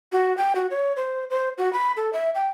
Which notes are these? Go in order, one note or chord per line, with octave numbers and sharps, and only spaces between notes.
F#4
G5
F#4
C#5
C5
C5
F#4
B5
A4
E5
G5